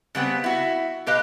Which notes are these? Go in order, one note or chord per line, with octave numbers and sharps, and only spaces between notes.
C#3 G3 B3 C4
E4 F#4
B2 G4 B4 D#5 F5